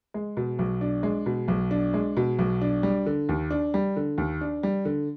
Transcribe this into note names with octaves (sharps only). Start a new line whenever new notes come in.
G#3
B2
B1
D4
G#3
B2
B1
D4
G#3
B2
B1
D4
G3
D3
D#2
D4
G3
D3
D#2
D4
G3
D3